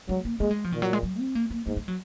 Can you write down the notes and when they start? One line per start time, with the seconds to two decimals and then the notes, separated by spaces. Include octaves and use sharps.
0.09 F#3 G#3
0.25 A#3
0.40 G#3 A#3
0.51 G#3
0.64 F3
0.72 A#2 D#3
0.82 F#3
0.93 G#3
1.03 F#3
1.19 C4
1.35 A#3
1.51 A#3
1.66 G#2 A#3
1.77 G#3
1.88 F#3